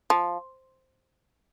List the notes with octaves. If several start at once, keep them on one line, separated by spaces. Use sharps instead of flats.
F3